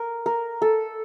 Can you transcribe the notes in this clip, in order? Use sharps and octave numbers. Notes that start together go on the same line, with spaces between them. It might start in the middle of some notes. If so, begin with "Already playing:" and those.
Already playing: A#4
A#4
A4